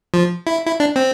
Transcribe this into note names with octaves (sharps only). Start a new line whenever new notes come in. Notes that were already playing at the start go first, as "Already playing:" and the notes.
F3
E4
E4
D4
C4